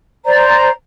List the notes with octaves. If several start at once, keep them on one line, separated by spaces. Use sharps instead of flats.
C5 D5 A#5